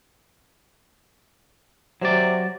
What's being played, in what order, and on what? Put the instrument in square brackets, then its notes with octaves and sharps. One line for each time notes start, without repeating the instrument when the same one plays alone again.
[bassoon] C3 [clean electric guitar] F#3 D5